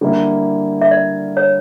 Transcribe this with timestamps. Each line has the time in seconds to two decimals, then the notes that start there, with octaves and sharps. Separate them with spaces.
0.01 D3 G3 A#3 E4
0.81 E5
0.91 D5
1.37 C#5